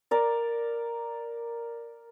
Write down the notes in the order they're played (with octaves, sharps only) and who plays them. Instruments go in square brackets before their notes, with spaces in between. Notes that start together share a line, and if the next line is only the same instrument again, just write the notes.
[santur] A#4 D5